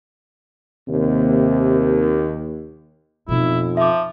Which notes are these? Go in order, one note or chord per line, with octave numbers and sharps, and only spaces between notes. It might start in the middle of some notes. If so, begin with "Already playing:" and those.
D#2 C3
F2 B2 D#4 E4
F3 E5 D6